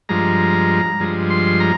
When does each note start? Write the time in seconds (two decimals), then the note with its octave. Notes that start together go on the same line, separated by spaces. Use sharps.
0.09 G2 F3 G#3 A#5
0.99 G2 F3 G#3
1.30 C6
1.60 A#5